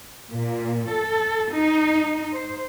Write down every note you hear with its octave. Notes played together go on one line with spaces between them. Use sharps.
A#2
A4
D#4
C5